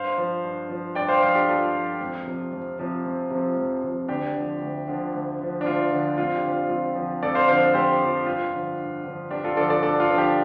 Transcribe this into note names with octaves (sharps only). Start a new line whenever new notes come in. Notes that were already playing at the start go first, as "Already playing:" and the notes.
Already playing: G2 C5 F5
F3
G2
F3
G2 D5 G5
C5 F5
F3 C5 F5
D4 G4
G2 F4 A4
F3
F2
C3 F3
F2
C3 F3
F2
C3 F3
F2
C3 F3
D2 D4 G4
D3 F3
D2
D3 F3
D2
D3 F3
D4
D2 F4
D3 F3
F2 F4
D4 G4
D3 F3
F4
F2 F4
D3 F3
F2 A4 D5
C5 F5
D3 F3 C5 F5
F2 G4 C5
D3 F3
G2 F4
D3 F3
G2
D3 F3
G2 D4 G4
F4 A4
D3 F3 A4 D5
A4 D5
G2 A4 D5
F4 A4
D3 F3
D4 G4